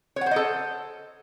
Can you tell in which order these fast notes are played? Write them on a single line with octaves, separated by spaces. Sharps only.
C#5 F#5 C5 D#5 A4